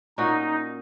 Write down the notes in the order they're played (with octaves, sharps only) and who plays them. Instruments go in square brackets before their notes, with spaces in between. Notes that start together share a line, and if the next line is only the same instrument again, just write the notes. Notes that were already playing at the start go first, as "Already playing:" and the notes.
[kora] A#2 C#4 F#4 [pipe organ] D#4